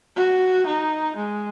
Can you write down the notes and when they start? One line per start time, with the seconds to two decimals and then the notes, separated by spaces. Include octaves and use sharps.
0.16 F#4
0.66 D#4
1.16 G#3